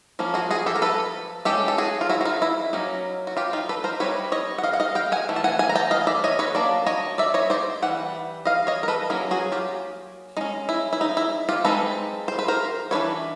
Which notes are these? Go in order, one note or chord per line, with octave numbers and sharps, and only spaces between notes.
F3 A#3 C#4
F#4 G#4
F#4 G#4
G4 A4
A#4
A4 B4
G#3 C#4 G4 A4
A4
F#4 G#4
F4
E4 F#4
F#4
D#4 F4
E4
F#3 A#3 C#4 D#4
F#4
F4 G4
D#4 F4
A4 B4
A#4 C5
G3 C4 D#4 B4 C#5
C#5 D#5
F#5
D#5 F5
F#5
D#5 F5
F5 G5
F#5 G#5
E3 A3
A5
F#5 G#5
F#5 G#5
A#5
G5 A5
D#5 F5
D5 E5
C#5 D#5
B4 C#5
F#3 A#3 D4 D5
C#5 D#5
D5 E5
C#5 D#5
C5 D5
E3 G3 F#5
D#5 F5
C#5 D#5
A#4
A4 B4
F#3 A#3 C#4 G#4 A#4
F#4 G#4
F4 G4
G#3 C#4 D#4
E4
E4
D#4
E4
F4 G4
G#3 C4 D#4 A4 B4
C5
B4
A#4 C5
E3 A3 D4 B4 C#5